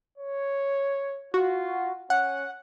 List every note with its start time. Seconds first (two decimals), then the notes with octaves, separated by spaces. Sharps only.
0.18 C#5
1.34 F4 F#4
2.10 C#4 F#5